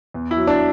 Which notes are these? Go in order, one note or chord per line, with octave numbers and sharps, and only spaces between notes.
E2
E4
F#3
D4